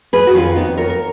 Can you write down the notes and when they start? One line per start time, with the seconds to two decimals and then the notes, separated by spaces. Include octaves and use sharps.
0.13 G#4 B4
0.27 F#4
0.35 F2 D#3 C#4 F4
0.56 B3 D#4
0.77 A#4 C#5
0.90 A#4